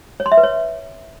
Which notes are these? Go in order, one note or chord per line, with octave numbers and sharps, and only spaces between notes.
C#5
C6
E5
B4
C#5